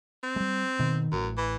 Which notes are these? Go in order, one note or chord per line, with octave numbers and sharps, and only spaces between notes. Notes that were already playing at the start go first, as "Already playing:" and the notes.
C4
G3 G#3
B2 D#3
A1 F#2
E3